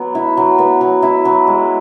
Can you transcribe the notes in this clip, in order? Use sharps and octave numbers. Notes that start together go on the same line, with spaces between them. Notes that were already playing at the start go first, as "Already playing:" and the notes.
Already playing: F#3 B3
E4
F#3
B3
F#3
E4
F#3
G#3